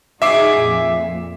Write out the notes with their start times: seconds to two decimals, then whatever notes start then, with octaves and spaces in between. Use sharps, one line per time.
0.22 D#4 F#4 G#4 E5 D6 C7
0.58 F2 A#2